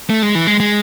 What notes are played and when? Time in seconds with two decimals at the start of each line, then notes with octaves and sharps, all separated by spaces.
0.10 A3
0.23 G#3
0.35 E3
0.47 G#3
0.60 G#3